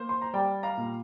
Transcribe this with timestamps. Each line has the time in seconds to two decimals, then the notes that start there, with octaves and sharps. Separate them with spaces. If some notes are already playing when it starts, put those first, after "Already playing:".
Already playing: A#3 C5
0.09 C6
0.22 A#5
0.34 G3 D5 G5
0.63 F5 A#5
0.77 A#2